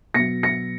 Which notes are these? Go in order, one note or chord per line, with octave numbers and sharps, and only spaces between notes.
B2 F#3 A#6 C#7
A#6 C#7